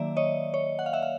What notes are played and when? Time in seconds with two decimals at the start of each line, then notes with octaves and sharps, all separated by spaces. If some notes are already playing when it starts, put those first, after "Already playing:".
Already playing: D#3 F#3 A#3 D5 E5
0.17 C#5 D#5
0.54 C#5
0.79 F#5
0.86 F5
0.93 E5 F#5
1.03 F5